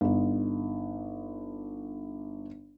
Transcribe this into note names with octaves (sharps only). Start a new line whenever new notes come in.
G1 D#4